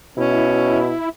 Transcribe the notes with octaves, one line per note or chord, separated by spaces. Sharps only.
B2 C#4 E4